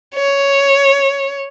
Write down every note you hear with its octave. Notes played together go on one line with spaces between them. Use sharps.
C#5